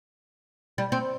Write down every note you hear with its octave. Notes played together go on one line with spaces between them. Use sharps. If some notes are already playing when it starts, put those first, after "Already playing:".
G3
C4